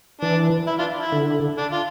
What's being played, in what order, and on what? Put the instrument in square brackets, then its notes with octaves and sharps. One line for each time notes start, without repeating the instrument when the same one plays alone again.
[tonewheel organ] E3 [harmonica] D4
[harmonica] E4
D4 F4
E4
[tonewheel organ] D3
[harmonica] D4
F4